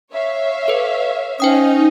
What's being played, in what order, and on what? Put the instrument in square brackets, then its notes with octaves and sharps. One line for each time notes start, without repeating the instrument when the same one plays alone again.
[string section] C#5 E5 F5
[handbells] A4 B4
[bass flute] C#4 [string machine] D#4 [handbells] C5 G5 D#6